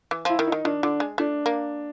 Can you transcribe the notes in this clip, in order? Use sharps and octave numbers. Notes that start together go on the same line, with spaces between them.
E3
F3 E4
D#3
D#4
D#3
D#3 D4
D3 D4
G#3
A3 D4
A#3